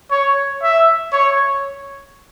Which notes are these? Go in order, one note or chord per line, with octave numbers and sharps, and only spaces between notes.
C#5
E5
C#5